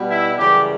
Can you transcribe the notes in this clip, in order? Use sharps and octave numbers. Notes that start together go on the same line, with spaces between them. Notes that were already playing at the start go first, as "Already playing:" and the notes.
Already playing: B2 G3
E4
F#2 C#3 E3 G3 G4